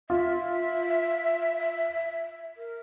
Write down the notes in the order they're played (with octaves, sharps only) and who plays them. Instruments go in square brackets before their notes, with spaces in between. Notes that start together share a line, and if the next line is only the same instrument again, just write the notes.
[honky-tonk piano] F4 [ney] E5
[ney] A#4